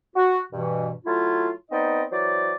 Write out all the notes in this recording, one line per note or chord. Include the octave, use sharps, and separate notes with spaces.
F#4
G2 B2 E3
F#3 A3 E4 F4
B3 C4 D#4 D5 D#5
E3 F#3 C5 D5